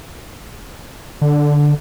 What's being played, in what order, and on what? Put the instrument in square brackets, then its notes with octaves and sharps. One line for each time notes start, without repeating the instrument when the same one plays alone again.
[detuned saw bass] D3